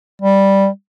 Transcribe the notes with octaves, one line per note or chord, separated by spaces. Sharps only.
G3